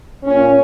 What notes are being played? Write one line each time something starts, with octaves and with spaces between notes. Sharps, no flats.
A#2 C#4